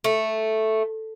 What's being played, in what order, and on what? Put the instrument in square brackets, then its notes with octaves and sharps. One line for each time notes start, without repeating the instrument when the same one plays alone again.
[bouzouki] A3